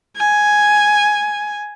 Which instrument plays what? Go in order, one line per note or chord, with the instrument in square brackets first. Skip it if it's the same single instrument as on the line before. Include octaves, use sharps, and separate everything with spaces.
[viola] G#5